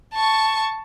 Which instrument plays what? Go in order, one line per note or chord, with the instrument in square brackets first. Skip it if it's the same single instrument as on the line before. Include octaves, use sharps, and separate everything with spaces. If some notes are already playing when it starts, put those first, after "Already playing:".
[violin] A5 C#6